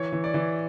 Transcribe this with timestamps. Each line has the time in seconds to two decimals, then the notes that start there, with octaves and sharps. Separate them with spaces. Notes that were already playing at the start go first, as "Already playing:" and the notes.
Already playing: E3 C#5
0.13 E3
0.24 D5
0.34 E3